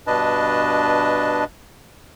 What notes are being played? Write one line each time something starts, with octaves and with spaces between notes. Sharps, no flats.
G2 B2 D4 B4 D#5 A5